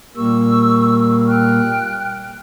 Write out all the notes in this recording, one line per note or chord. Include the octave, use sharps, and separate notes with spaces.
A#2 G3 A#3 C#6 E6
G5 F6 F#6